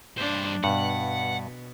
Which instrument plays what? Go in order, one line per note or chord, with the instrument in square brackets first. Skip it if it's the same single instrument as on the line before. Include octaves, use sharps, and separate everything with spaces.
[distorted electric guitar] G2 C5 [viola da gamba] D4
[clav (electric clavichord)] G2 [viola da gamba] B2 [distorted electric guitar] F#5